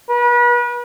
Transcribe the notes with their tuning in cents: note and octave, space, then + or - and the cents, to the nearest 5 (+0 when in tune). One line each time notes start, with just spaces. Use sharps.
B4 -35